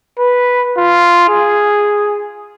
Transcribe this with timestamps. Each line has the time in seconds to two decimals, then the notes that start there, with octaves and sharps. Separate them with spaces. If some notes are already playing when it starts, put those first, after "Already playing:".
0.19 B4
0.78 F4
1.29 G#4